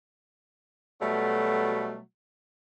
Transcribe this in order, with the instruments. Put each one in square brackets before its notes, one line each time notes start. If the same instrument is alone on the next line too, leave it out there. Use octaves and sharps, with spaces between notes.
[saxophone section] B2 F#3 G3 A3